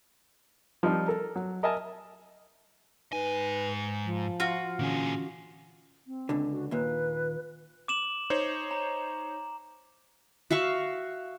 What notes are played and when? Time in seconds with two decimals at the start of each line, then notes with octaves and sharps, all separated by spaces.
0.83 F3 G3 C4 D#4
1.08 A4 A#4
1.35 F#3
1.63 A#4 D#5 E5 G#5 A5
3.13 G#2 D#4 B4 G#5
4.05 F3
4.40 F4 F#4
4.79 A#2 D3 E3 C#4 G#4
6.07 C4
6.29 C#2 D3
6.51 F#4
6.71 D#2 A#2 B4
7.88 D6 E7 F#7
8.30 D#4 C5 C#5
8.71 A#5
10.51 F#4 E5 F5 C#6